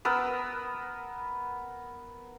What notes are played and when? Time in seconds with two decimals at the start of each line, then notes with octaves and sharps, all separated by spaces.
0.05 B3 A#4 E6